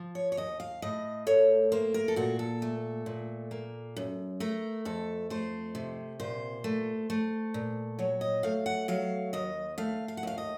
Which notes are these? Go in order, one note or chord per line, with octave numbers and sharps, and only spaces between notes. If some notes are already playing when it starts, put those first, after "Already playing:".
Already playing: F3
C#5
C#5
D#2 D#5
F5
A2 D#5
A3 C#5
A#3 C5
A#4
A4
A#2 F#4
A4
A3
A#2
A#3
F#2
A3 A#4
F2 A4
A3 C5
C3
A#2 C5
A3
A3
A#2
F#3 C#5
D#5
A3 F5
F#5
F#3 F5
D#2 D#5
A3 F5
F5
F#5
D#2 F5
D#5